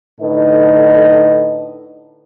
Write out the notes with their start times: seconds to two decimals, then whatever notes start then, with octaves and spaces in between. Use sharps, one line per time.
0.21 A2 D3 D#4 B4 D#5